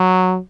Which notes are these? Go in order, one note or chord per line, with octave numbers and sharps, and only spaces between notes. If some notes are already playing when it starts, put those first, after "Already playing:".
Already playing: F#3